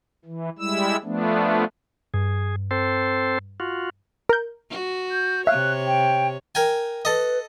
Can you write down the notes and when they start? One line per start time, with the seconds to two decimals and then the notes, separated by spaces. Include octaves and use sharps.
0.25 E3
0.58 G3 G#3 E4 E6
1.03 F3 A3 B3 D4
2.14 G2 G#4
2.71 C4 A4 C5
3.60 F4 F#4
4.29 A#4 G6
4.70 F#4
5.11 G6
5.47 C3 C#5 E5 F5 F#6
5.87 G5
6.55 A#4 G5 G#5
7.05 A4 B4 D#5